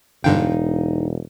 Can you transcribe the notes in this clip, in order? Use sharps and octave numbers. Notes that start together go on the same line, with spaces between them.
E1 G2 D3 D#4 F5 G5